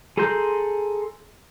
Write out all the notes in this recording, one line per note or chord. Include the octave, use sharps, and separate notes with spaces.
G#4 A4 A#5 C6 G6